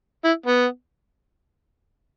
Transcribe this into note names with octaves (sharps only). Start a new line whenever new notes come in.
E4
B3